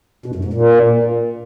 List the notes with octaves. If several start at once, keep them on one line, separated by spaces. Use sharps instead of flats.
B2
F#2
G#2
A#2